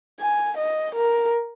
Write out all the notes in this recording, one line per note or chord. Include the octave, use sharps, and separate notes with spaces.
G#5
D#5
A#4